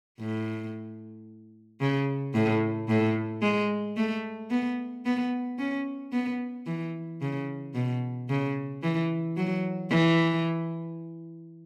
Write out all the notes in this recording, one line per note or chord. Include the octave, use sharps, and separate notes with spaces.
A2
C#3
A2
A2
G#3
A3
B3
B3
C#4
B3
E3
C#3
B2
C#3
E3
F#3
E3